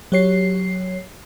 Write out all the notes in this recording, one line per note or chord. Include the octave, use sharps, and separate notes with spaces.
F#3 G4 C#5 C7